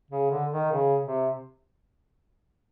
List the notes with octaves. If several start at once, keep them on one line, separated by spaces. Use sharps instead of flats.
C#3
D3
D#3
C#3
C3